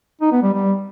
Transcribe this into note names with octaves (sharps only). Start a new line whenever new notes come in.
D#4
B3
G3
G3